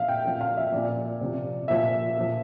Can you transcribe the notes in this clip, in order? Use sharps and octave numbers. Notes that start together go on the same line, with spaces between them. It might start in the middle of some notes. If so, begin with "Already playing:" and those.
Already playing: A#2 F3 E5 F5
G5
A#2 F3
F5
E5
A#2 F3 D5
C3 F3
A#2 F3 E5
A#2 F3